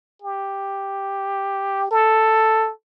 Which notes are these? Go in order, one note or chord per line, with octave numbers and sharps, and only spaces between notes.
G4
A4